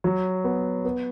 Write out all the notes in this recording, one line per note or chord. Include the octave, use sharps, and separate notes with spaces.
F#3
B3
B3